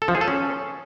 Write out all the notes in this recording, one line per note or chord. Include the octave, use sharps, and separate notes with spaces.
A4
F3
G#4
A4
C#4